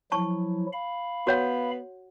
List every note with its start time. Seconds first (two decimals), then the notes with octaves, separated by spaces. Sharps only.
0.12 F3 F#3 E4 A5 C#6
0.73 F5 B5
1.27 B3 F#4 C#5 F#5